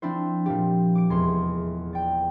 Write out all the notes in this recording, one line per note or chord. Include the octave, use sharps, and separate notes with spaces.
F3 C4 D4 E4 C5
A#2 F3 G4
D6 D7
F1 E2 G#3 C6
D5 G5